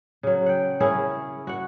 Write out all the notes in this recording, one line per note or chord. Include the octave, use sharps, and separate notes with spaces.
C#3 F#3
F#5 G5
C#4 E4 G#4 A#4
F#4 F#5